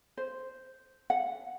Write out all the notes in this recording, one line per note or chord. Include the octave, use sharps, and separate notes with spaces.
C5
F#5